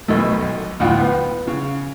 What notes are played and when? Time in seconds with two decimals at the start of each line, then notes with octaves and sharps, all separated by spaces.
0.08 B1 B2 D#3 A3
0.41 B1
0.80 D2 A2 E4 F4 F#5 G5
1.00 B3
1.47 C#3